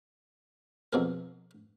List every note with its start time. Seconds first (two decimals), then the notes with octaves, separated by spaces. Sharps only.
0.93 F2 B2 G#4 A#4